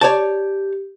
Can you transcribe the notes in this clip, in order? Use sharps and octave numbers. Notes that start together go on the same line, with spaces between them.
G4 C#5 D5 A5